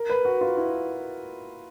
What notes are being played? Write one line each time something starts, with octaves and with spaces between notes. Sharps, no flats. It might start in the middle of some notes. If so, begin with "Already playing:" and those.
Already playing: A#4
B4
F#4
F4
E4